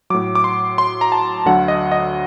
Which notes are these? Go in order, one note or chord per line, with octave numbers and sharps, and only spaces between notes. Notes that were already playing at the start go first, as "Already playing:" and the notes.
A2 F#3 D6
D6
C6
C6
A#5
A5
D2 D3 F#3 F#5
D#5
D#5